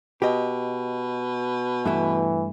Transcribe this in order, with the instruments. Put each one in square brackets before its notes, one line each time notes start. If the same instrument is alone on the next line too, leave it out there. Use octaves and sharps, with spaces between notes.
[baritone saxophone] B2 [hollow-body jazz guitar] G4 D#5
[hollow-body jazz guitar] G2 A3 E4 [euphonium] E3